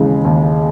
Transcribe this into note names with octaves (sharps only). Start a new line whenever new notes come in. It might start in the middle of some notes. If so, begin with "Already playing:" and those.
Already playing: D#2 C#3 E3 G#3
D#2